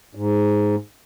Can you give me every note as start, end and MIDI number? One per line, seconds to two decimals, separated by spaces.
0.15 0.75 44